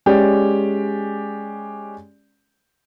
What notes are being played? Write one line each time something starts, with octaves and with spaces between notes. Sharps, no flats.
G#3 C#4 G4 D5